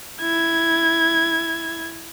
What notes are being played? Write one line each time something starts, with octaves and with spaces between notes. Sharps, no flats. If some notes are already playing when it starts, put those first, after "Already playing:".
E4 G#6